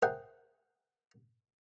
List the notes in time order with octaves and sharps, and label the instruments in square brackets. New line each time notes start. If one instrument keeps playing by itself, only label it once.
[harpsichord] G#4 A#4 C5 E5 F#5 G5